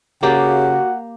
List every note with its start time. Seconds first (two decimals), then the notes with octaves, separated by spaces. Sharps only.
0.23 C#3 A#3 F#4 G4 D5 F#5